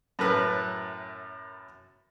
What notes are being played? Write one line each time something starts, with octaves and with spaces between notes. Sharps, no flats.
F#2 A2 A#4 B4 F#6